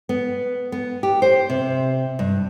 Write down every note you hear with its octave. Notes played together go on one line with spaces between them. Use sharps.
B3
B3
G4
C5
C3
G2